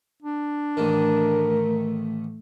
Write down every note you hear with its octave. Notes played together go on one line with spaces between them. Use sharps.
D4
A1 D#3 A3 A#4